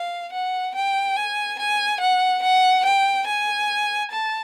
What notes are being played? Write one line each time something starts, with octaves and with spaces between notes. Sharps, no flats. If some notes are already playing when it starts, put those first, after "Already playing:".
Already playing: F5
F#5
G5
G#5
G#5
F#5
F#5
G5
G#5
A5